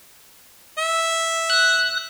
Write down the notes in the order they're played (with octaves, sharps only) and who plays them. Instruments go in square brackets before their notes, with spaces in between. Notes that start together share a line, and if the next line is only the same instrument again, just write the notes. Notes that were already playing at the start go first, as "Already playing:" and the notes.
[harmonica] E5
[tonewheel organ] F#6